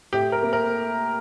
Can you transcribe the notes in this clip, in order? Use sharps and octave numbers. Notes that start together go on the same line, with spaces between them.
A2 G4
A#4
A#3
A#4